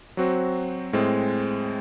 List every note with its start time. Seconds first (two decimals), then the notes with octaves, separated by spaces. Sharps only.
0.17 F#3 C4 F#4 C5
0.93 A2 G#3 C4